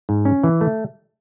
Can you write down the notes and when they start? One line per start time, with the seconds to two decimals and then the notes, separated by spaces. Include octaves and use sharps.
0.09 G#2
0.25 C#4
0.44 E3
0.61 A3